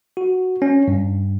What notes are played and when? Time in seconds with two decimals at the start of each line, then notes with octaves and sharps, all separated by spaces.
0.17 F#4
0.62 C#4
0.88 G2